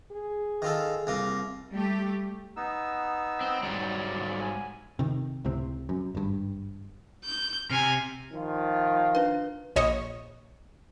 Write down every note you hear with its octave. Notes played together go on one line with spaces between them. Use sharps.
G#4
D#3 F4 A4
C2 A#3 F4
G3 A3 G4
B3 D#4 E6
C4
G#2 F#3 G3 D5
G#5
C3 D#3
C#2 A2 C3 C4
F#2
G#1 G2
G6
C3 G#5 F6
D#3 F3 F4
D4 B4
A#1 C#5 D#5